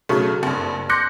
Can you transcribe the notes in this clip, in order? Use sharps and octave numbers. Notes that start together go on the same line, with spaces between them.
B1 C#3 F#3 A3
F#1 G2
C6 D6 F#6 G6 A#6 C#7